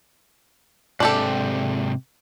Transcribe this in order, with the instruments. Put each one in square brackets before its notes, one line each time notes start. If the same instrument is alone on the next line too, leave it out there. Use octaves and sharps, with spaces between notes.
[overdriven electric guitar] G#2 C3 [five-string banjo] D4 G4 A4